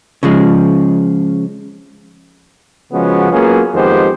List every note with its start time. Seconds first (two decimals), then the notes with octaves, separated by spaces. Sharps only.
0.23 C#3 F3 G#3
2.92 C#3 F3 G#3 B3 C#4 F#4
3.31 F#3 A#3 B3 C#4 F4 G#4
3.73 F2 D#3 G#3 B3 G4 C5